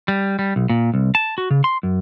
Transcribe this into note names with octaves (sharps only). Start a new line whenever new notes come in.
G3
G3
B1
A#2
C2
A5
F#4
C#3
C6
F#2